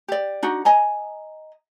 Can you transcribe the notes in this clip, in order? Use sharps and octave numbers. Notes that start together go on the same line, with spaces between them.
G4 D5
D4 D#4 F#4
D#5 G#5 A#5